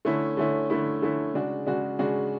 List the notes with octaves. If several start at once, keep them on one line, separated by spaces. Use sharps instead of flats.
D3 A3 C#4 E4
D3 A3 C#4 E4
D3 A3 C#4 E4
D3 A3 C#4 E4
C#3 G#3 D4 F#4
C#3 G#3 D4 F#4
C#3 G#3 D4 F#4